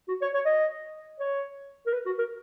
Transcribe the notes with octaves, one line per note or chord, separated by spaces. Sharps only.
F#4
C#5
C#5
D#5
C#5
A#4
B4
F#4
A#4